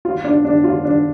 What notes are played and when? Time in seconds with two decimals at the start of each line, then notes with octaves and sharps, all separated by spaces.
0.05 F4
0.24 D4
0.45 D4
0.64 F4
0.85 D4